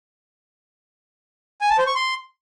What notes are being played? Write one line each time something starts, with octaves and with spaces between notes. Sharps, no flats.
G#5
A5
C5
C#6
C6